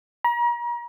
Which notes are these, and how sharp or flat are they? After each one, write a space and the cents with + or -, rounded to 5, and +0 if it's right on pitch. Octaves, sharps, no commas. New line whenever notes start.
A#5 +40